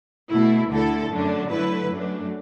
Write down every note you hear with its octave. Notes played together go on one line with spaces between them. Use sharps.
B2 A3 E4
D2 D3 A3 E4 A4
F#2 D3 A3 D4
D3 F#3 A3 E4 B4
F#2 F#3 A3 D4